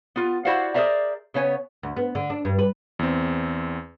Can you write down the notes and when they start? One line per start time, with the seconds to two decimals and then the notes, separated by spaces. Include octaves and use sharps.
0.16 B3 F4
0.45 E4 F#4 C5 D5 F5 F#5
0.74 G#4 A#4 C5 D5 E5 A#5
1.34 C#3 B3 C#5 G#5
1.83 D2
1.97 B3
2.15 D3
2.30 D4
2.45 G2
2.59 B4
2.99 E2 C4